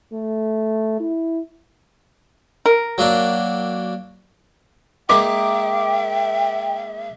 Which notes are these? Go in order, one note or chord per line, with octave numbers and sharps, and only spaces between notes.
A3
E4
A#4
F#3 A#3 D4
G#3 A#3 D#4 E5 G5 D6